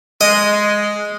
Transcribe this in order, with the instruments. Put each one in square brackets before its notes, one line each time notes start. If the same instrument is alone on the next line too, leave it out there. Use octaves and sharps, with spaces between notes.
[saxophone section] G#3 [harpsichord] D#5